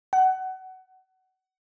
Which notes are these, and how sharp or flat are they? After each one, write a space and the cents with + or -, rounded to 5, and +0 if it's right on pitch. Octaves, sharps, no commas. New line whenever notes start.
F#5 +25